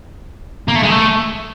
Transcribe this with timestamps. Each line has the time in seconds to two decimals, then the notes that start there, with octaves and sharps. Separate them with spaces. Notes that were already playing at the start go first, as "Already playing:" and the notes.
0.68 A#3
0.76 A3
0.83 G#3
0.91 A3